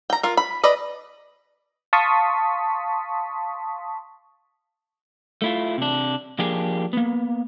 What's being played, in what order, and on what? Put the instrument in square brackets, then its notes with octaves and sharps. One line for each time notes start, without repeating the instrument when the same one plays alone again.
[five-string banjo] G5 A#5
F4 A#4
B5
B4 D5 D#5
[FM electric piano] F5 A5 C6 C#6 D#6 B6
[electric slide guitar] A3 E4 F4
C3 D4
F3 A#3 D4 G4 G#4
A#3 B3